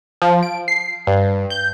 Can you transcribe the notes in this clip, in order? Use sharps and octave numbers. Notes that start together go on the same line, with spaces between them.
F3
D7
C7
G2
G6